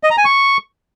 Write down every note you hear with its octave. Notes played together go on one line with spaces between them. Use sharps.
D#5
A#5
G#5
C#6